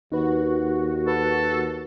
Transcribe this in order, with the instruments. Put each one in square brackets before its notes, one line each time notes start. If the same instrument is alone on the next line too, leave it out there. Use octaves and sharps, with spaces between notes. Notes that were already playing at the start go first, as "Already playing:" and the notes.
[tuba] D#2 [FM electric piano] D#4 B4 [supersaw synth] F#4
[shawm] A4 [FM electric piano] B4